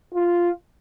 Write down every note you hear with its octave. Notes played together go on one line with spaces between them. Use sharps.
F4